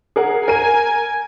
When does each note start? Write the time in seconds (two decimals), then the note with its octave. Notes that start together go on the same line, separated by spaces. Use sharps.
0.16 G#4 A#4 F#5
0.48 A#4 G#5 D#7